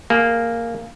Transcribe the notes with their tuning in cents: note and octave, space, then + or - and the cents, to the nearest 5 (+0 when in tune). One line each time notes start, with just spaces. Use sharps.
A#3 -5 G#4 +10